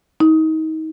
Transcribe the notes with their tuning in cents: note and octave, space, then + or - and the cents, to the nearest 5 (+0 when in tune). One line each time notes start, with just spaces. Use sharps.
D#4 +30